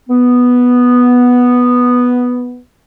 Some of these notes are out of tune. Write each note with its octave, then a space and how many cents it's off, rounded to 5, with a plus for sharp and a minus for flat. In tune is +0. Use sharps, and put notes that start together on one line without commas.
B3 -5